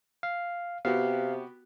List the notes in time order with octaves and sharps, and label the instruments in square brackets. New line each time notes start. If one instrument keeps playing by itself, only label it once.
[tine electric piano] F5
[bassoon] C3 [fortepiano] B3 F#4 G4 [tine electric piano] F5